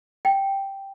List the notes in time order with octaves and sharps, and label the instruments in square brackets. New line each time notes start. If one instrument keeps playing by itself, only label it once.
[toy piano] G5